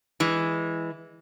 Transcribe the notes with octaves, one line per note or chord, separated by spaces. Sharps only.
E3 G#3